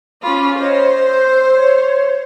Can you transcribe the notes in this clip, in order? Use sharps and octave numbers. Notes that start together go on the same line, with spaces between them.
C#4 F4 B5 C#6 D6
C5 C#5 D#5
E6 G6
C#5